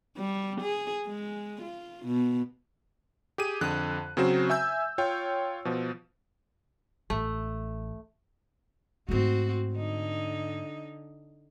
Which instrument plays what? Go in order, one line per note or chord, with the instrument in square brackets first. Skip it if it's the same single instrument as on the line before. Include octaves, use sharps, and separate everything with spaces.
[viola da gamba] G3
G#4
G#3
F4
B2
[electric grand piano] G4 G#4 D#7
F2 D3 F#6
C#3 F#3 C4 F#4 C5 E7
E5 G#5 E6 G6
F4 C#5 G5
B2 F3
[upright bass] A1 [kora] A3
[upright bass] G#2 A3 [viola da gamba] C4 F#4
[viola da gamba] D3 D#4